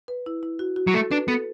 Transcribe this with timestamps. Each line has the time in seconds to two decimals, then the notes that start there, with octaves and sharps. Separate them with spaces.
0.08 B4
0.26 E4
0.43 E4
0.59 F#4
0.76 F#4
0.87 F#3
0.94 A3 A4
1.11 D4 B4
1.28 B3 A4